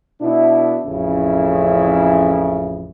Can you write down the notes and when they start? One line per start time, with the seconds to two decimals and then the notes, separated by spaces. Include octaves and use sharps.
0.21 B2 D4 E4
0.85 A1 F2 C#3 C#4 E4